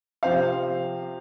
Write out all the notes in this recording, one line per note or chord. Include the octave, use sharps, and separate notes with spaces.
C3 F3 C4 C5 F5